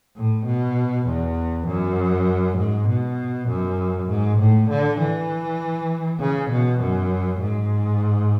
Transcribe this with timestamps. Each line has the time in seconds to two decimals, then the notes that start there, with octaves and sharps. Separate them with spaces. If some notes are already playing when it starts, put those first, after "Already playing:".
0.16 A2
0.46 B2
1.07 E2
1.67 F#2
2.58 G#2
2.88 B2
3.48 F#2
4.09 G#2
4.39 A2
4.69 D3
4.99 E3
6.20 C#3
6.50 B2
6.81 F#2
7.41 G#2